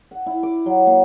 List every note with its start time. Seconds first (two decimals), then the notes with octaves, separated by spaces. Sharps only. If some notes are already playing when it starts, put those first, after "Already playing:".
0.11 F#5
0.26 E4
0.43 D6
0.66 F#3
0.87 A#3